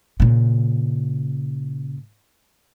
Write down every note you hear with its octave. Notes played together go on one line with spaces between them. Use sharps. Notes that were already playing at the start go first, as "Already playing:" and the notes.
A#2 C#3